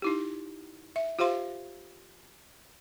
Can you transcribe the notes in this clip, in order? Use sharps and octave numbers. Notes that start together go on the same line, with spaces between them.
D#4 E4 G4
E5
F4 G4 C5 F5 C6